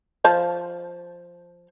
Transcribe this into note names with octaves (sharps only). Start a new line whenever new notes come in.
F3 C5 A5